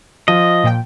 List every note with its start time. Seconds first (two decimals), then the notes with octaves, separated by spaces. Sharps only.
0.28 F3 D#5
0.64 A#2 G5